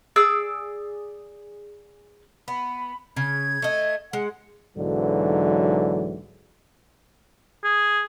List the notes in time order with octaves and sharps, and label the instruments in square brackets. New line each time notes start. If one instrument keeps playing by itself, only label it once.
[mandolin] G#4 D5 E6
[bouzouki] B3 [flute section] B5
[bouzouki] C#3 [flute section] G#6
[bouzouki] A3 D#5
[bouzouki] G#3 [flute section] F#5
[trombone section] B1 G#2 D3 E3 F#3
[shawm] G#4